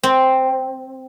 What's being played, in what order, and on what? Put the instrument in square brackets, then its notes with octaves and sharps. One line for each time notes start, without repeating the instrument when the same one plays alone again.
[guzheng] C4